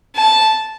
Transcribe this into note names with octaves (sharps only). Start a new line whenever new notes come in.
A5